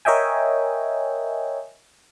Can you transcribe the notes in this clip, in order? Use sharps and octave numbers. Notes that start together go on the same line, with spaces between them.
A#4 C#5 D#5 E5 G5 G#5